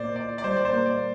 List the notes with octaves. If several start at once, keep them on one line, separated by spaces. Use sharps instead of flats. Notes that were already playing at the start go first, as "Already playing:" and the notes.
Already playing: A#2 A#3 C5 D5
A#2 D5
D5
G3 C5
D5
C5
A#3
D5